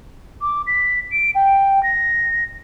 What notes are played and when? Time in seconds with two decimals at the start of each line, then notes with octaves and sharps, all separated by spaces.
0.41 D6
0.67 B6
1.12 D7
1.35 G5
1.83 A#6